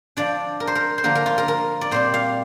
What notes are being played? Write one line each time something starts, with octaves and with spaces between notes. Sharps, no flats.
F3 D4 D5
A#4
C5
A#4
C5
D3 F3 A#3 A#4
A#4
F4
A#4
A#4
D5
A#2 G3 C4 C5
F5